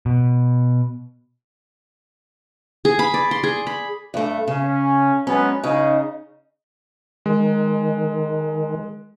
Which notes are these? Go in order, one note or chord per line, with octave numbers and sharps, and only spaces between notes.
B2
G#4
B5
D5
C6
G#4
B5
G2 A3
C#3 C#4
F#3 G#3 B3 C#4
C#3 D#4
D#3 G#3